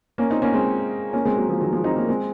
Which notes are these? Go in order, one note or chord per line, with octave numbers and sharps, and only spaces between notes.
A#3 C#4
C4 D#4
A#3 C#4
G#3 C4
A#3 C#4
G#3 C4
F#3 A#3
F3 G#3
D#3 F#3
F3 G#3
C4 D#4
A#3 C#4
G#3 C4